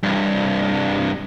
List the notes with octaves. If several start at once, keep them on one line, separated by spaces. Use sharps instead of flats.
C2 G2